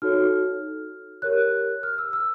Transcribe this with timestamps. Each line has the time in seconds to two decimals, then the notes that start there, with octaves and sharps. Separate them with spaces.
0.02 D#4 F#4 A4 C#5 F6
1.22 G4 A#4 C#5 F#6
1.83 F6
1.98 E6
2.13 E6